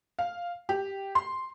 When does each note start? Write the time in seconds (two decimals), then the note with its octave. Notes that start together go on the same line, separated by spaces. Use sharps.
0.19 F5
0.69 G4
1.15 C6